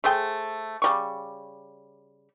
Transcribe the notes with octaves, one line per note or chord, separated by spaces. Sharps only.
A3 G#4 C5 G5
C#3 G3 C#6